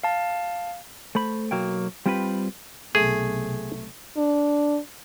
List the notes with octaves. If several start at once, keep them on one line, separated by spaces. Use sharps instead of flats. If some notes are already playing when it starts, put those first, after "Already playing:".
F5 A5
A3 C5 B5
B1 F#3 A#3 G5
G3 C4 F4 G4 A#4 B4
B1 C3 A3 G#4
D4